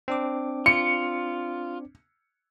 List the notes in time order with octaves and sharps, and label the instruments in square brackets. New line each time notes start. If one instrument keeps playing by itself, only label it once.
[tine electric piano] C4 D4 D6
[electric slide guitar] F4 [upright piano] C#7